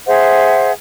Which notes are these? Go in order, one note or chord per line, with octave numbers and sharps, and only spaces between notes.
G#4 C5 E5 F#5